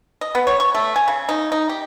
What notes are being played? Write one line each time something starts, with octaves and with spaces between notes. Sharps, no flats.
D#5
B3
C#5
C#6
A3
G#5
C#3
D#4
D#4
G4